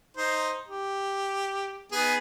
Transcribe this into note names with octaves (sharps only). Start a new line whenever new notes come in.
D#4 C5
G4
B3 D#4 G#4